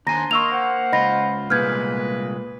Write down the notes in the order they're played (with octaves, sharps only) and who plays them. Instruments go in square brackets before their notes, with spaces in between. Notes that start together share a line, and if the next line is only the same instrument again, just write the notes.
[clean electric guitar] D#2 G#5 [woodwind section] D4 C5 C6 [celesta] A#5 A#6
[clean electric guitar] A#3 [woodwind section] D#5 C6 [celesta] C#6 E6 F7
[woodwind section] C5 F#5
[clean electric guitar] C#2 F4 [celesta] D#5 B5 A#6
[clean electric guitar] C2 A#2 G#3 [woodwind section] A#3 B4 [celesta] F6 G6 G#6